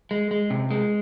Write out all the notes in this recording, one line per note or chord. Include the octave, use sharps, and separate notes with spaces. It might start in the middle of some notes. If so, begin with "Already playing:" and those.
G#3
G#3
C3
G#3